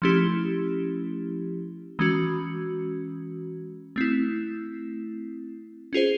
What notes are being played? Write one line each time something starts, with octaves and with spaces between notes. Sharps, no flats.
F3 A3 C#4 E4 G4
E3 G#3 C#4 F#4
A3 C4 E4
C#4 F4 G#4 C5